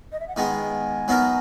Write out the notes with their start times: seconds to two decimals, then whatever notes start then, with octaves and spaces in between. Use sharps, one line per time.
0.12 D#5
0.20 E5
0.28 F#5
0.36 D#3 G#3 B3 G#5
1.08 F#3 B3 D#4 A#4